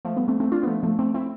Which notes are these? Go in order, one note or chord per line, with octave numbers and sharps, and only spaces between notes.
F3 A3
G3 B3
A3 C4
A3 C4
D4 F4
B3
F3 A3
F3 A3
A3 C4
C4 E4